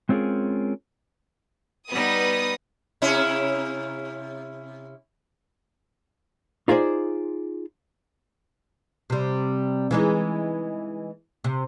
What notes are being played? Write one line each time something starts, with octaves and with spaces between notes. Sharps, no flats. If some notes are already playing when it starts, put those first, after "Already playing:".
G#3 C4 C#4 F4 G#4 A#4
G3 B3 D#4 D#6
C3 C#4 E4
D#4 F4 G#4 C5 D5
C3 G3
E3 G#3 D#4
C3